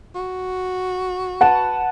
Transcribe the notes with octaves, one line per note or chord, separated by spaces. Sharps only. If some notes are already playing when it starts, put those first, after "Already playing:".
F#4
B4 F#5 A5